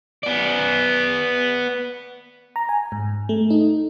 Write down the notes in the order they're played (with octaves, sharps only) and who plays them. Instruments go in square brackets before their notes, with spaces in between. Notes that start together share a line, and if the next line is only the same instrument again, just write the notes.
[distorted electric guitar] B3 D5
[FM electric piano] A#5
G#5
G#2
A3
D#4